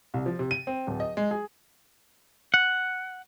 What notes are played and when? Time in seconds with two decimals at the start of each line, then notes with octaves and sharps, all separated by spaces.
0.14 C2
0.26 F3
0.39 C3
0.51 D#7
0.67 C4
0.87 D1
1.00 D#5
1.17 G#3
1.31 G#4
2.54 F#5